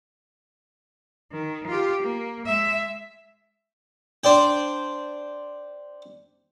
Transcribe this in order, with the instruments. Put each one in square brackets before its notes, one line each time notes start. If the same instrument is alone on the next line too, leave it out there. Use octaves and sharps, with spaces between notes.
[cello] D#3
F4 G4
A#3
G#3 E5
[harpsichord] D4 C5 D5 G5